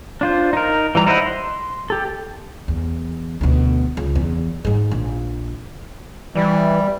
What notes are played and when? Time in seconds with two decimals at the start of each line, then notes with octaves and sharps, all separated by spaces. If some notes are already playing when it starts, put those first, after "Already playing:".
0.21 D4 F4 C5
0.53 D#4 A#4
0.95 E3 G3 A#5
1.06 D#4 E4 C5 D#5 F#5
1.26 C6
1.90 G4 A4
2.68 E2
3.41 D2 B2
3.97 C#2
4.15 E2
4.65 G#2 G#3
4.91 A#1
6.35 E3 G3